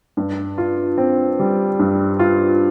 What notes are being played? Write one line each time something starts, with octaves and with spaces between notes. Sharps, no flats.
G2
F4
C4
G3
G2
F4